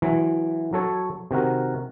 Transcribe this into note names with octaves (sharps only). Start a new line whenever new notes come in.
E3 F#3
F#3 A4 C#5
C3 D#3 F#4 A#4